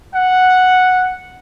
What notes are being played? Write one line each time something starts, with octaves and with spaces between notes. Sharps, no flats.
F#5